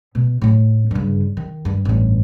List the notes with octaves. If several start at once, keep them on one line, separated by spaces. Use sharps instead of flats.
B2
A2 A3
G2 C#3
D#3
G2
A1 G2